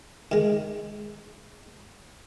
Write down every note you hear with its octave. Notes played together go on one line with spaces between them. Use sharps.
D#3 G#3